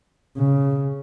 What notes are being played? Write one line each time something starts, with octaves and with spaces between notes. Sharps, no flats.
C#3